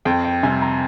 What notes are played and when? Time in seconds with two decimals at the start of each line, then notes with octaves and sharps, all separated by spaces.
0.05 F2 G5
0.25 G5
0.43 C3 G3 G#5
0.62 A#5